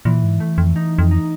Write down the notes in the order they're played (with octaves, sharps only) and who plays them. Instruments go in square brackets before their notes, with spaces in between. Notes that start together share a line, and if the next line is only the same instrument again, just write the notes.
[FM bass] A#2 [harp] E3
[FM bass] G#2
[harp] A3
[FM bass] F2
[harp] D#4
[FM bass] F2
[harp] D#4